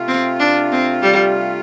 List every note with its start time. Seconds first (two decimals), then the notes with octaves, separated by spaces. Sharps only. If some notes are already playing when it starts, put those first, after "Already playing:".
Already playing: C3 A3 F4
0.08 C4
0.40 D4
0.72 C4
1.03 G3